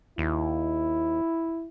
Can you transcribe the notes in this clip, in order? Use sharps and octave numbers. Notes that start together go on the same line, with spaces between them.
D#2 E4